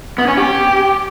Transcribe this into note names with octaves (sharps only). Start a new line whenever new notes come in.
B3
C#4
G4